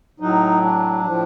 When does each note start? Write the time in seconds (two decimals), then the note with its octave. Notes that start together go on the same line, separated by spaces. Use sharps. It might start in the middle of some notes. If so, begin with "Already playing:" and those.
0.20 A2 F#3 D#4
0.62 D4
1.04 A2 F3